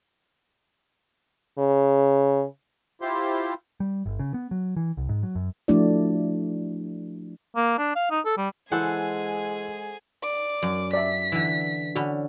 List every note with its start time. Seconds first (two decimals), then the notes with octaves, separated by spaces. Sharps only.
1.58 C#3
3.02 E4 F4 G4 C5 C6
3.80 G3
4.06 G1
4.19 C#3
4.34 B3
4.51 F#3
4.77 E3
4.97 C2
5.09 G#2
5.23 F#3
5.35 F#2
5.68 F3 A3 D4 E4 F#4 D5
7.56 A#3
7.78 D4
7.96 F5
8.11 D#4
8.25 A4
8.37 G3
8.72 E3 G#3 G#4 A4 C5 F#5 G#5
10.23 D5 D6
10.63 F#2
10.93 D5 E5 B6
11.32 D3 E3
11.96 D3 C#4 F#4 B5